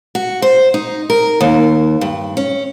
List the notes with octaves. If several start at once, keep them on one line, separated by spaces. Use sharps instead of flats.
F#4
C5
D#4
A#4
D#2
G2
C#4